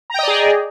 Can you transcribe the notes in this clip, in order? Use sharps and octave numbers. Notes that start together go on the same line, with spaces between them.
G#4 D5 D#5 G5 A#5